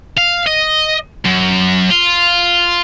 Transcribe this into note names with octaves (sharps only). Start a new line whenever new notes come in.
F5
D#5
F#2
F4